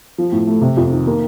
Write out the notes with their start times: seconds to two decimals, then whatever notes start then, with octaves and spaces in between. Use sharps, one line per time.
0.18 F3
0.32 A2
0.47 A3
0.61 C3
0.77 F2
0.91 D#3
1.07 A#3